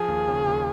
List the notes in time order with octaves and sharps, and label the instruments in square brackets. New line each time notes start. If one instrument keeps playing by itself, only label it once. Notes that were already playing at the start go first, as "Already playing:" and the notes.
Already playing: [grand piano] F3 [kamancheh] G#4
[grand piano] D#2
C#3
D#2